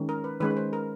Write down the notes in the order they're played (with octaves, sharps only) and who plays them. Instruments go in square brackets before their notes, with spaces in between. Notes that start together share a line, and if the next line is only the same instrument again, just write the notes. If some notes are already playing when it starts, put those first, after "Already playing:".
Already playing: [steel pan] D#3 G#3 C#4
A#4
B4
D#3 G#3 C#4 B4
B4
C5
A#4